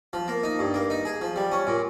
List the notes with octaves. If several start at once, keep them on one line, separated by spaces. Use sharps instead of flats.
F3
A#3
D#4
G2
A#3
D#4
G#4
F3
G3
C#4
A#2